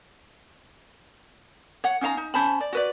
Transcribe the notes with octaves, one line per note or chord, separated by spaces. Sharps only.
C#5 F#5
C#4 D#4 F5 A#5
D#4
C#4 C5 A5 B5
D5
F#4 B4 D5